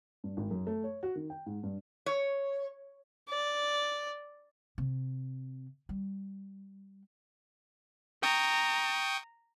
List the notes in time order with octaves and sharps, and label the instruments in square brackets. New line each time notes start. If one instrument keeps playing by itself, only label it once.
[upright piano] G2
G#1
F#2
A3
C#5
F#4
D#3
G5
G#2
G2
[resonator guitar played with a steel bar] C#5
[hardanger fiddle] D5
[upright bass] C3
G3
[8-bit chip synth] G5 C#6 D#6 [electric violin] A#5